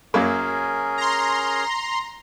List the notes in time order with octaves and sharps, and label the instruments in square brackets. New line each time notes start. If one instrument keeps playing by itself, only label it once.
[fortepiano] F#2 F#3 A#3 [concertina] C#4 G#4 A#4
[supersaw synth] A#5 C6